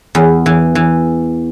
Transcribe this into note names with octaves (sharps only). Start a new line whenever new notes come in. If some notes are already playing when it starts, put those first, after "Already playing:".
E2
E3
E3